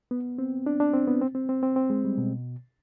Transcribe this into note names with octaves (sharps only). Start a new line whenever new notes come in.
B3
C4
D4
D4
C4
B3
C4
C4
C4
C4
C4
G#3
G3
B2